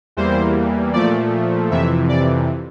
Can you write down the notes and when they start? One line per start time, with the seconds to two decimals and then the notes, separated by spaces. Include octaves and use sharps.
0.17 E2 E3 G3 A#3 C5
0.93 A#2 F3 A3 D5
1.71 F2 C3 E3 E5
2.09 D5